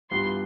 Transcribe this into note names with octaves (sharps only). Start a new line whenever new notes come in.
G2 E3 G3 B3 F4 C6